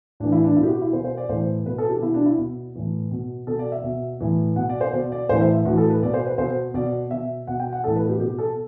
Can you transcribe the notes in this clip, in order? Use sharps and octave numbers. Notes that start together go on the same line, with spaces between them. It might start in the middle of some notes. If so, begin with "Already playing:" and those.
A2 E3 D4
E4
D4
B2 E4
G4
F#4
E4
B2 C5
C5
D5
A2 E3 C5
B2 B4
A4
G4
B2 E4
D4
E4
B2
A2 E3
B2
B2 A4
D5
E5
B2
A2 E3
B2 F#5
D5
C5
B2 D5
D5
A2 E3 C5
E5
E5
A2 E3 F#4
A4
B4
B2 D5
C5
B4
B2 C5
B2 D5
B2 E5
B2 F#5
G5
F#5
A2 E3 A4
B4
G4
B2 G4
A4